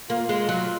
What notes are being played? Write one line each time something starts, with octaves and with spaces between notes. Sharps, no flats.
A#3 F4
G#3
F#3